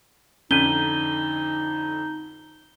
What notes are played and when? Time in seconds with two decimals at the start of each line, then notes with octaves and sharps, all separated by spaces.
0.51 F2 D3 C#4 D#4 G6 D#7 G7